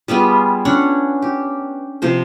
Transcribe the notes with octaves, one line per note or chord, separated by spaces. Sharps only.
G3 B3 F4 G#4
C#4 D4 C#5 F#5
G4
C3 F3 C5